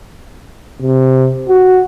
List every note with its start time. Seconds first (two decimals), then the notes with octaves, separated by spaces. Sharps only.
0.82 C3
1.48 F#4